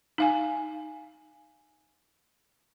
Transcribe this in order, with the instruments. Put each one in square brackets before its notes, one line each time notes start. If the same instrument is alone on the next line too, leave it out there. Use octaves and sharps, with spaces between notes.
[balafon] D#4 F5 G#5